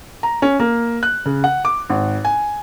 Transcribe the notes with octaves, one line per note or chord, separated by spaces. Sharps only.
A#5
C#4
A#3
F#6
C#3
F#5
D6
G#1
G#5